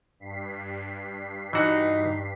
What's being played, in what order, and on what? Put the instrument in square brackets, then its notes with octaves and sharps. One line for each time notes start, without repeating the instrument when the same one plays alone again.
[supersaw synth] G2 B6 C7
[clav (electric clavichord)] E3 F#4 [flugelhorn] D#4